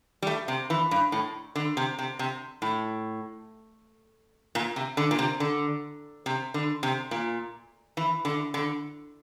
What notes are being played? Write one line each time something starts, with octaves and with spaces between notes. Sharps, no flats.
G3
A3
C3
E3
G2
A2
D3
C3
C3
C3
A2
A#2
C3
D3
A#2
C3
D3
C3
D3
C3
A#2
E3
D3
D3